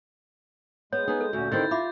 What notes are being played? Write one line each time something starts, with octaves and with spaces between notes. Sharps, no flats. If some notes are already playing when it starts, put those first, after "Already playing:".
G#3 B3 C#5 G6
B3 D#4 G#4
A4
D2 A#2 C#4 F#4
D3 D#3 C4 E4 G4 G6 A6
F4 E5 B5 D6